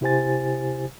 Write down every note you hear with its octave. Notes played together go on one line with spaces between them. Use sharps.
C3 E4 G4 C5 G#5 A6